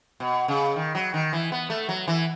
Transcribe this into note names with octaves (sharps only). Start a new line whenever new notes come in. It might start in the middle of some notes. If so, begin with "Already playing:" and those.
B2
C#3
D#3
F#3
D#3
E3
B3
A3
F#3
E3